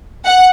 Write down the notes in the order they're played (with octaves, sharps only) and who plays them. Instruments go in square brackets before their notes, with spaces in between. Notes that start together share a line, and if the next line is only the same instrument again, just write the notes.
[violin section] F#5